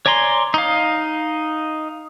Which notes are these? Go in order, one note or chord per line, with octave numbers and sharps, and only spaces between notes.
C#5 D5 G#5 A#5 C6
D#4 F5